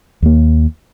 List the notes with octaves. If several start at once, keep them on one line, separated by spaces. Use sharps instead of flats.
D#2 A#3